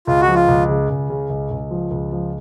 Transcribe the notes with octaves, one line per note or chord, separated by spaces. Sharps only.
C#2 F4
F#4
F3
F4
C#2
C#3
C#2
C#3
C#2
C#2
F3
C#2
F3